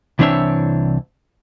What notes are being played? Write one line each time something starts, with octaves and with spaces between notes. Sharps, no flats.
C2 E3 C4 D4 C#5 E5